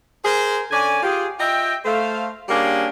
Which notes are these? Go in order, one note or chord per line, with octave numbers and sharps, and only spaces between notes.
G#4 A#4 C5
D3 C#4 D5 G#5
F4 G4 G#4
F4 D#5 E5 G5
A3 C5 F5
G3 A#3 C#4 D4 G4 G#4